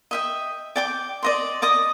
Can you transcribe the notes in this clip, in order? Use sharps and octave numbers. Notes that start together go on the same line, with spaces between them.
D#5 E5 G5
D5 G5 D6
D5 D#5 C6
D5 D#5 D#6